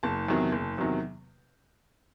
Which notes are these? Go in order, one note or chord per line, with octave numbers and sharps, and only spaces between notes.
F#1 A5
E2 C3 D#3 F#3
F#1
E2 C3 D#3 F#3